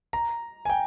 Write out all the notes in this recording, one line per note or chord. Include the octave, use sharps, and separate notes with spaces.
A#5
G#5
G5